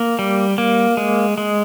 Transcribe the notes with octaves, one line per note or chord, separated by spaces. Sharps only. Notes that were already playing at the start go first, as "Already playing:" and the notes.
Already playing: A#3
G3
A#3
G#3
G#3